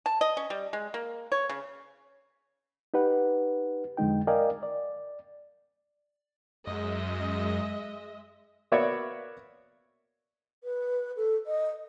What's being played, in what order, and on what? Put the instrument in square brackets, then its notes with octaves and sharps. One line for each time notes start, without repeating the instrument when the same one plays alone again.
[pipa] A5
D#5
C#4
G3
G#3
A#3
C#5
C#3
[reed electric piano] D#4 G4 B4 F#5
F2 D3 G#3 D#4 G5
A#4 D5 D#5 F5 G5 G#5
D5
[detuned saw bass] F#2 [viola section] G#3 D#5 E5
[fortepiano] A#3 B3 F#4 C#5 D5 E5
[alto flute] B4
A4
D#5